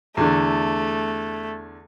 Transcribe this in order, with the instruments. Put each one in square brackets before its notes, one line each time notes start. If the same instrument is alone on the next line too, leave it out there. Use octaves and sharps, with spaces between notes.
[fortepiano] E2 D3 [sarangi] A3